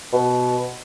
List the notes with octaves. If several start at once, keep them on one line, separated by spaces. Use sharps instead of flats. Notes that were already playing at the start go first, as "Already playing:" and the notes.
B2